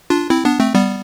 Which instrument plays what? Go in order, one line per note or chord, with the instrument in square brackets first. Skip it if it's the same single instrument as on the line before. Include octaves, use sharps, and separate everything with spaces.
[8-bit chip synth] D4 F4
C4 E4
B3 D4
A3 C4
G3 B3